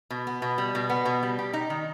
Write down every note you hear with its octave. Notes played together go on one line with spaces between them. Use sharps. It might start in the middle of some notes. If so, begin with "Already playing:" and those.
B2
B3
B2
G3
B2
B3
B2
G3
G4
D#4
D#3